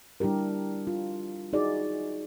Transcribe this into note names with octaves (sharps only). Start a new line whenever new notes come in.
G3 D4 E4 G4 A#4
F4
D#4 F#4 G#4 D5